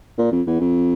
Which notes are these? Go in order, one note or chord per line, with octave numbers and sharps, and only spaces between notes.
A#2
F2
E2
F2